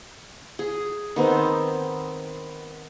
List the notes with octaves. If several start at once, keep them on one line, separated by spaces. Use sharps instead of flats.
G#4
D#3 B3 C4